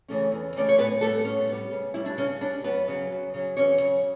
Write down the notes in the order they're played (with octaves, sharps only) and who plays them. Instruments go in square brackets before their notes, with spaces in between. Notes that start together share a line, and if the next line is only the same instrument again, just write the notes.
[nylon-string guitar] C#3 E3 A3 C#4
E2
C#3 E3 A3 C#4 D5
C#5
A2 B3 B4
G3 A3 B3 A4
A2 C#4
G3 B3
C#3
G3 C#4 E4
D4
C#3 C#4
G3 C#4 D4
F#2 B3 B4
C#3 F#3 C#4
F#2
C#3 F#3 C#4
E2 C#4 C#5
C#3 F#3